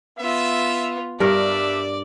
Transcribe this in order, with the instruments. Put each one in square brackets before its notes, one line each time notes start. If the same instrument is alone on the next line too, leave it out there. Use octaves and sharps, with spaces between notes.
[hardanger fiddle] B3 F4 [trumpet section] E5
[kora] G2 A#4 [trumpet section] G3 D4 E5 [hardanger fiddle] D5